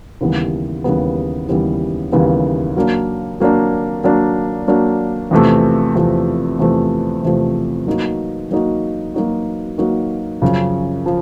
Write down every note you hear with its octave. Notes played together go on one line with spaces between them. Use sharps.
D#2 C#3 E3 G3 B3
D#2 C#3 E3 G3 B3
D#2 C#3 E3 G3 B3
D#2 C#3 E3 G3 B3
F#3 A#3 D4
F#3 A#3 D4
F#3 A#3 D4
F#3 A#3 D4
E2 C3 F3 A3
E2 C3 F3 A3
E2 C3 F3 A3
E2 C3 F3 A3
F#3 A#3 D#4 F#4
F#3 A#3 D#4 F#4
F#3 A#3 D#4 F#4
F#3 A#3 D#4 F#4
F#2 C#3 F3
F3